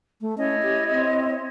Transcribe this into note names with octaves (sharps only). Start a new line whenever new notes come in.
A3
C#4 E4 C#5 D#5
G4
C4